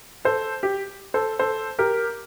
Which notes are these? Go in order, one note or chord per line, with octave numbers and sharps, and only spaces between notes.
A4 C5
G4
A4 C5
A4 C5
G4 A#4